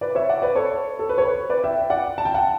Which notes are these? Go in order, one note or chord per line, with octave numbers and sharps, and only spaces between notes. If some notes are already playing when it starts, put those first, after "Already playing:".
B4 D5
C#5 E5
D5 F#5
B4 D5
A4 C#5
A4
B4
C#5
B4
B4 D5
E5 G5
D5 F#5
A5
G5
F#5 A5